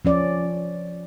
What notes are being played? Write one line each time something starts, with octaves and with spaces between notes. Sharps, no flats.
F3 C#4 D5